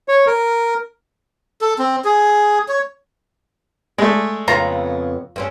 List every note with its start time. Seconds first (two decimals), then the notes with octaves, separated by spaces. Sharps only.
0.08 C#5
0.27 A#4
1.61 A4
1.79 C4
2.05 G#4
2.68 C#5
3.98 G#3 A3 D5
4.48 F2 C#3 B3 F4 A#5
5.36 G2 C4 C#4